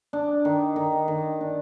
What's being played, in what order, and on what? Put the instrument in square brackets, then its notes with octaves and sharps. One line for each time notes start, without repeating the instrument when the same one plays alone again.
[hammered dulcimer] D4
D#3
D#3
D#3
D4